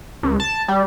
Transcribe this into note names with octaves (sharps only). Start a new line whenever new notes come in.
C#2
A5
G3